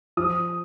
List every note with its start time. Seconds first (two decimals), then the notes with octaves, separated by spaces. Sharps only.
0.17 F3 D#6